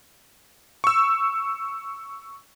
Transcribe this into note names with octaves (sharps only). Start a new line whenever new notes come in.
C#6 E6